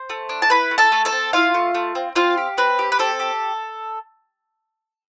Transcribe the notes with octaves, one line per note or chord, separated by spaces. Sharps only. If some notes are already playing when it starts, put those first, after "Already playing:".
Already playing: C5 C6
A3
D4
A5
E4 B4 B5
A3
A4 A5
A3
A4 A5
C4
E4 F4 F5
A3
A3
C4
C4 F4 F5
G4
C4 B4
G4
B4
C4 A4
G4